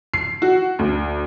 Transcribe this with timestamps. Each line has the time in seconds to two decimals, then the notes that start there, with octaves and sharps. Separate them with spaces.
0.14 C7
0.42 F#4
0.79 D2